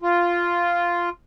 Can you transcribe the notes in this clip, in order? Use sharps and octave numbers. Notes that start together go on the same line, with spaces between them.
F4